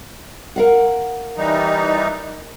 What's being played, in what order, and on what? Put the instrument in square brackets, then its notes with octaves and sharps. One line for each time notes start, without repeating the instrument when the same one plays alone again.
[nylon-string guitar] A#4 F5 F#5
[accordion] E3 G3 D#4